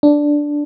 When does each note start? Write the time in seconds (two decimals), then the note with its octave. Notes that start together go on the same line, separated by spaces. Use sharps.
0.03 D4